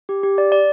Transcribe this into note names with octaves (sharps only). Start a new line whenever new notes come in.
G4
G4
D5
D5